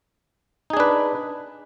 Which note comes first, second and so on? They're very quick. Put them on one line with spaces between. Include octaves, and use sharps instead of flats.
D#4 G#4 D4 B4